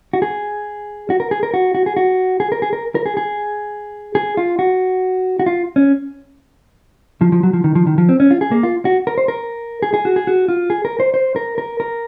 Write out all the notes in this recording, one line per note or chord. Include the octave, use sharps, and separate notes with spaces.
F#4
G#4
F#4
A#4
G#4
A#4
F#4
F#4
G#4
F#4
G#4
A#4
G#4
A#4
A#4
G#4
G#4
G#4
F4
F#4
F#4
F4
C#4
F3
F3
F#3
F3
D#3
F3
D#3
F3
C4
C#4
F4
G#4
A#3
F4
F#4
A#4
C5
A#4
G#4
G#4
F#4
G#4
F#4
F4
G#4
A#4
C5
C5
A#4
A#4
A#4